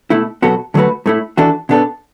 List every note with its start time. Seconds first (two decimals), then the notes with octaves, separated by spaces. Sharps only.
0.10 B2 A3 E4
0.42 B2 F#3 B3 F#4 A4
0.74 D3 F#3 A3 F#4 B4
1.06 A2 A3 E4
1.37 E3 D4 F#4 A4
1.69 B2 B3 D4 A4